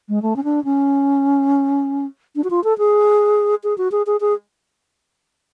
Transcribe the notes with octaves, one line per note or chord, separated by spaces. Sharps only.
G#3
A3
C#4
D4
C#4
D4
F#4
F4
A4
G#4
G#4
F#4
G#4
G#4
G#4